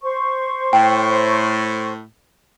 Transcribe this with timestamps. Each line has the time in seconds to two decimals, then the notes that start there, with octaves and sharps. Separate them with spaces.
0.03 C5 C#6
0.73 A2 G5